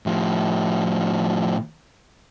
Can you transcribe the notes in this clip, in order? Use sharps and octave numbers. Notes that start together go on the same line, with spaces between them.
A2 F3